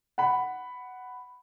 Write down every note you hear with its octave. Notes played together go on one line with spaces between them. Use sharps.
F#5 B5